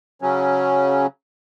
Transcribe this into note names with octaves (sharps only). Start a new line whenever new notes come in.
C#3 F#3 C#4